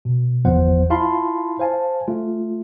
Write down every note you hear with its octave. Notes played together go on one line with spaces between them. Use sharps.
B2
G1 E2 F3 B3 C5 F#5
E4 F4 F5 A5 B5 C6
C5 F5 G#5 A5
A3 F4